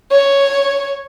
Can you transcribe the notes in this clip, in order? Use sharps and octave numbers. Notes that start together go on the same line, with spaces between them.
C#5